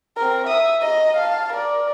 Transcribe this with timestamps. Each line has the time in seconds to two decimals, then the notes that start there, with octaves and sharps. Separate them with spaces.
0.17 C4 A#4
0.47 E5 D#6
0.81 D#5 A#5
1.17 F5 A5
1.53 A#4 D5